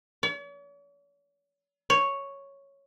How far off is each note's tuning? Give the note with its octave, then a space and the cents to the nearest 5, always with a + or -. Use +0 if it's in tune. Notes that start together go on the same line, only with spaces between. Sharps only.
C#5 +45
C#5 +0